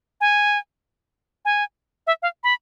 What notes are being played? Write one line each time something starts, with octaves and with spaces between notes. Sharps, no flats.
G#5
G#5
E5
F5
B5